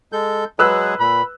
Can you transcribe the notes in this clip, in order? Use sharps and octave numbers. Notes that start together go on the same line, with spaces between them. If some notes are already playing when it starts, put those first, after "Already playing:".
G#3 A4 G6
F#3 G#3 G#4 B4 E6 F#6
A#2 B5